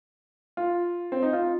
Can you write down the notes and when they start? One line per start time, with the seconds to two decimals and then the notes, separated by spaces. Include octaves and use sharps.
0.57 F4
1.12 C4
1.22 D#4
1.33 F4